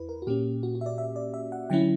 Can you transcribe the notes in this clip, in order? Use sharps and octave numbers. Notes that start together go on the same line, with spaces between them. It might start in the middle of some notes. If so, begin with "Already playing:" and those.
Already playing: E2 E4 B4
A#4
F#4
A#2 A#3 C#4 G4
F#4
F#4
E5
D5
E5
D5
E5
F#5
D3 F#3 C#4 E4 G5